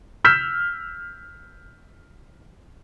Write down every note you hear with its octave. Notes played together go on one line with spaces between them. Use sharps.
E6 F6 G6 B6 E7